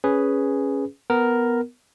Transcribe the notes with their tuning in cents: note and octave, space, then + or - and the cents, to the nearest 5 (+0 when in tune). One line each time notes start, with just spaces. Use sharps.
C#4 +0 G#4 +0 B4 +0
B3 +0 A#4 +0